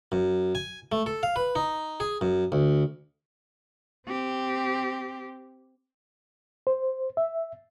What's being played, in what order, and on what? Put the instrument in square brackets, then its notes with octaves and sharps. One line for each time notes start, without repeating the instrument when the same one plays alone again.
[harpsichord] F#2
G#5
A3
A4
F5
B4
D#4
G#4
F#2
D2
[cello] C4 G4
[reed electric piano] C5
E5